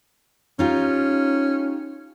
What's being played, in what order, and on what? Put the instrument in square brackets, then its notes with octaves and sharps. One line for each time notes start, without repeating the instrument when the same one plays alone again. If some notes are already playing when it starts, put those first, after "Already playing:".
[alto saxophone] C#4 [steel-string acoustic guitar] D#4 F4 G4